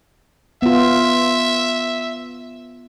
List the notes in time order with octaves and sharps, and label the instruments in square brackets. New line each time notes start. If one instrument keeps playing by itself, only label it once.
[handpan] B3 F4 [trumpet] E5